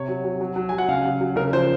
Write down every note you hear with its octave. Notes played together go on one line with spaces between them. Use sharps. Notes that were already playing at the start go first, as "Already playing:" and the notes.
Already playing: C3 C#5
F#3
F#3
F#3
F#3
F#3 G#5
F#5
C#3 F5
F#3
F#3
C#3 A#4
F3 C5